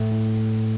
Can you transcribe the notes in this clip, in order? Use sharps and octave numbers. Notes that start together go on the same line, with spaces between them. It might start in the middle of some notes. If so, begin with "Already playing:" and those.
Already playing: A2 A3
A2